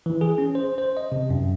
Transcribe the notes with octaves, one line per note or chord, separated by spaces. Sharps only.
E3
G#4
C#4
C5
C5
D#5
C3
F#2